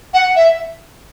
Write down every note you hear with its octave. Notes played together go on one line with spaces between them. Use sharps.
F#5
E5